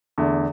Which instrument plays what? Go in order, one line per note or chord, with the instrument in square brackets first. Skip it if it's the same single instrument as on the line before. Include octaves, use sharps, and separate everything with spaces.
[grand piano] E2 D3 A3